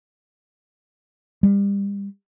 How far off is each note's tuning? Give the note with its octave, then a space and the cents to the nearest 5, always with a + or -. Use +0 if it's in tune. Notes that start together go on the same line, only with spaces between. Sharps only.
G3 +35